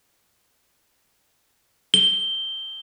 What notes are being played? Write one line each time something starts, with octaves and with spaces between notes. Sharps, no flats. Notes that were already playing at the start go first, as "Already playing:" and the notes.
G7